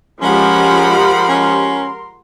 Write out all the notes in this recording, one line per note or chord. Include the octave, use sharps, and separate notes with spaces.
F3 G#3 C#4 G4 A#4 F#5 B5 C6
C#4